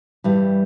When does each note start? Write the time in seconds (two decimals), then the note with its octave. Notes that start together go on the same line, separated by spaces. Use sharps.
0.24 G2 E3 G3